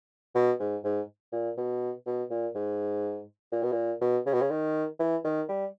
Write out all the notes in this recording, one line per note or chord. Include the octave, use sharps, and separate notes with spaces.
B2
G#2
G#2
A#2
B2
B2
A#2
G#2
A#2
B2
A#2
B2
C#3
B2
C#3
D#3
E3
D#3
G3